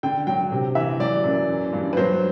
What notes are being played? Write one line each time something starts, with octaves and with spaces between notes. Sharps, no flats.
D3 G5
F#3 G5
C3
E3 E5
F#3 D5
F#2
E3
G2
B4
F#3 C5